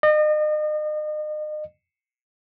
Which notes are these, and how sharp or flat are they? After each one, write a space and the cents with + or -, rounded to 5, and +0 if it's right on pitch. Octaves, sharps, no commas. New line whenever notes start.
D#5 -40